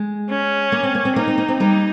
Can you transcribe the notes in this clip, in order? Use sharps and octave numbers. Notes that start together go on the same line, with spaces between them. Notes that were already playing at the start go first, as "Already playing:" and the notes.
Already playing: G#3
C#4
A#3
C4
A#3
C4
A#3 D#4
C4
A#3
C4
G3 A#3 D#4